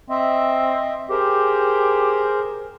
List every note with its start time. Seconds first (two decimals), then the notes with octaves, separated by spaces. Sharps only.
0.10 C4 D#5 E5
1.10 G4 G#4 A#4 C5